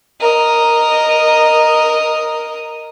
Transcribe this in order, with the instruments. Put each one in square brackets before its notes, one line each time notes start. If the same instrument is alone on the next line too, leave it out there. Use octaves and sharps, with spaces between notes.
[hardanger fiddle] A#4 D#5